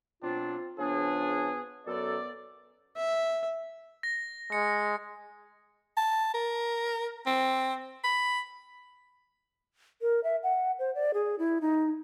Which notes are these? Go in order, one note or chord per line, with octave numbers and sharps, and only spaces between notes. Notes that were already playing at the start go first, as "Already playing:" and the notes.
B2 F#3 C4 D4 F4
C#3 F3 B3 D4 G#4
F#2 B3 A4 D5
E5
A#6
G#3 C#7
A5
A#4
C4
B5
A#4
E5
F#5
C5
D5
G#4
E4
D#4